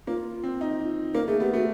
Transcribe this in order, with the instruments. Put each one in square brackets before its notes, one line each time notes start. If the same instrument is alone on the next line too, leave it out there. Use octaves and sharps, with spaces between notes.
[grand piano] A#3 [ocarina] F4
[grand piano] C4
D#4
[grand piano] A#3 [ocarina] A#4
[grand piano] A3 [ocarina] G#4
[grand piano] B3 [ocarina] G4
[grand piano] A3 [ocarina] F#4